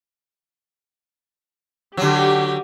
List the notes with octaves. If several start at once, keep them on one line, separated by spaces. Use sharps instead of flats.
D3 F#3 G4